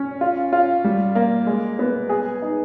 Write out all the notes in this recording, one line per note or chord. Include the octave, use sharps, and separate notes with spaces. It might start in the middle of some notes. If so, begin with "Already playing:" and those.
Already playing: C#4
F4
F4
G3
A#3
G#3
B3
G#4
D#4